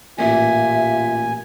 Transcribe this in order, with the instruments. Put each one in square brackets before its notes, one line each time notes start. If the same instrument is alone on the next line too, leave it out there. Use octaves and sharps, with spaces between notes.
[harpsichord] A1 A#2 E3 [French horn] F4 [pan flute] E5 [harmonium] G#5